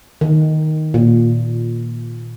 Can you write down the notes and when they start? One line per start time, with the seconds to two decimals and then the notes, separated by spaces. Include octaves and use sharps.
0.21 D#3
0.94 A#2